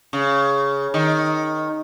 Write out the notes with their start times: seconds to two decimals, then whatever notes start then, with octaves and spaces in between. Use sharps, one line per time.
0.13 C#3
0.94 D#3